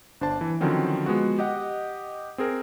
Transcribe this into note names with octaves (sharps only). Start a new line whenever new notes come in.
G1 D4 C5 A5
E3
D3 D#3 F3 F#3 C4 C#4
F3 G#3 B3 F#4
G4 D#5 F#5
C4 G#4 A#4